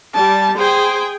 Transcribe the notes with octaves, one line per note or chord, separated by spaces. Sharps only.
G3 A5
G#4 C5 G5